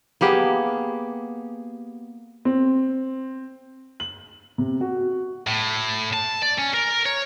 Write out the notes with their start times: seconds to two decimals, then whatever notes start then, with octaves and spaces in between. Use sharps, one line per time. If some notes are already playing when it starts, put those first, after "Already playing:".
0.21 A#3 B3 G4 G#4
2.45 C4
4.00 F#7
4.58 C3
4.81 F#4
5.47 A2
6.14 A5
6.43 D5
6.59 C#4
6.74 A#4
7.06 C#5